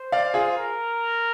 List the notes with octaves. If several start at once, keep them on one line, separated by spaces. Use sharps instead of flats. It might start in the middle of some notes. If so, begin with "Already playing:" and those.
Already playing: C5
D5 F5
F4 G#4
A#4